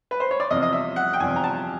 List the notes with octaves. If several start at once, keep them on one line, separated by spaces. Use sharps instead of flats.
B4
C5
C#5
D5
E2 C3 F3 D#5
D#5
E5
F#5
G5
E2 C3 F3 G#5
A#5
A5